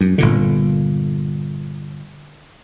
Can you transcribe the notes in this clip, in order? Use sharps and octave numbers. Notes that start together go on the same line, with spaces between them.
F#2
G1 A#2 D3